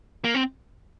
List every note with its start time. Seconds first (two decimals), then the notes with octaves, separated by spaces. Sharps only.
0.24 A#3
0.35 C4